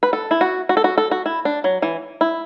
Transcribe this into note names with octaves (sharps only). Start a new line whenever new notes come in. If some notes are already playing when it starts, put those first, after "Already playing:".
B4
A4
E4
F#4
F#4
A4
F#4
A4
F#4
E4
D4
F#3
E3
E4